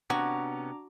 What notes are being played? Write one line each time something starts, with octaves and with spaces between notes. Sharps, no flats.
C3 B3 C#4 D4 F#4 A#5 D6